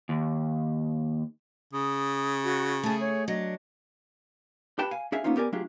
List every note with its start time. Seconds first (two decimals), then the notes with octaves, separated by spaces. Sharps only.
0.09 D#2
1.73 C#3 D#6
2.44 F#4
2.83 A3 G#4 A5
3.00 C#5
3.28 F#3 D4 D#5
4.79 G4 B4 G5 A5 B5
4.91 F5 G#5
5.12 D4 G#4 E5 F5 G#5
5.24 A#3 B3 C#4 D#4 F4
5.36 B3 G4 A#4 D5 G#5
5.52 F#3 A3 D4 F4 G4 G#4